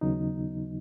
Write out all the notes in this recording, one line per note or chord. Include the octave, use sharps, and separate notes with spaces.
D#2 C#3 F#3 B3 D#4